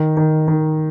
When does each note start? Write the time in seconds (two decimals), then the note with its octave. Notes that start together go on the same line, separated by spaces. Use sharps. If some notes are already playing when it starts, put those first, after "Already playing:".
Already playing: D#3
0.17 D#3
0.48 D#3